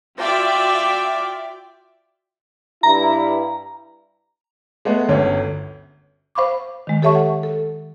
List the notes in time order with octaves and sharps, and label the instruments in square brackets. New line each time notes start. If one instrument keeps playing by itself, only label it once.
[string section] F4 F#4 D5 E5 G5 D6
[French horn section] G2 E4 [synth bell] A#5
[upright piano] G#3 A3 B3
G1 D2 C#4
[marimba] C5 F5 B5 C#6 D6
D#3 G#3
G4 A4 C#5 E5 A5 C#6
F#5
A4